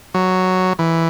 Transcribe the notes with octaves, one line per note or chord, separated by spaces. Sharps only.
F#3
E3